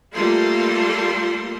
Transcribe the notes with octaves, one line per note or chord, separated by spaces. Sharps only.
G3 A3 A#3 F4 A4 C6